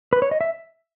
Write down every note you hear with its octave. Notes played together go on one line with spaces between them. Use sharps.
B4
C#5
D#5
E5